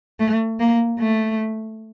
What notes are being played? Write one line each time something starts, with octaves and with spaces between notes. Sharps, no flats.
A3
A#3
A3